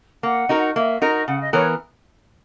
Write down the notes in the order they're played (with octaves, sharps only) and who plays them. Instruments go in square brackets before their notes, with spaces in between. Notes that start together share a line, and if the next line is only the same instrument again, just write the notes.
[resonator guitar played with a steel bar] A#3 [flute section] F#5
[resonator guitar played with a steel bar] D#4 F#4 A#4
[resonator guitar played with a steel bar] A#3 [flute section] E5
[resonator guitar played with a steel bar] D#4 F#4 A#4 [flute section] D#5
[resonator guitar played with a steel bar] C#3 [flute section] F#5
[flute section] D#5
[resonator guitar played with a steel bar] E3 B3 A#4 [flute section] C#5